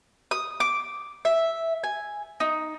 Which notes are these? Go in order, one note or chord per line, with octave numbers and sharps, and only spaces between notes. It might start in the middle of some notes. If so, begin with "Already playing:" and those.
D#6
D6
E5
G#5
D#4